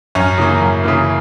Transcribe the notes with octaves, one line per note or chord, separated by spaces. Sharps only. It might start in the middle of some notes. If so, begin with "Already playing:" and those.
F#2 C#4
C#3 E3 A#3
F#2
C#3 E3 A#3